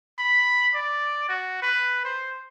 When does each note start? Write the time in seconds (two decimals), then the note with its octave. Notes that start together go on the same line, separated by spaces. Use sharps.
0.19 B5
0.74 D5
1.29 F#4
1.62 B4
2.05 C5